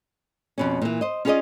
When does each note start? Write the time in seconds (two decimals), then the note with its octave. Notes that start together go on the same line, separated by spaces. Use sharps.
0.58 F2 B2 C#4
0.82 A#2 E3
1.01 C5 D#5
1.25 C#4 F4 G#4 B4 D5 D#5